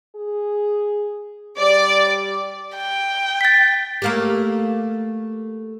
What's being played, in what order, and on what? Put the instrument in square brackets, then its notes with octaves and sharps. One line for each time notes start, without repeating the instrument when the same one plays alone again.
[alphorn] G#4
[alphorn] G3 [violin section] D5
[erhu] G5
[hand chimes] A6 B6
[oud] A3 A#3 G4